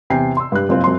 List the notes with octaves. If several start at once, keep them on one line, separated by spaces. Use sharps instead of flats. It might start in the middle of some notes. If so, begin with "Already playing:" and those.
E2 C3 G5 G#5 C7
C6 E6
G2 G4 F#6
F#1 A#2 C4 F4
F#2 C4 C6